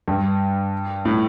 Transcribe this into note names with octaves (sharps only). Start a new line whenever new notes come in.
G2
A2